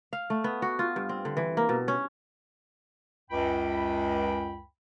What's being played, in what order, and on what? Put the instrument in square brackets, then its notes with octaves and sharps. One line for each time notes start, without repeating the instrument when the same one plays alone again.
[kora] F5
A3
B3
F#4
F4
G2
C4
D3
E3
A#3
B2
C#4
[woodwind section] C#2 F#2 G5 B5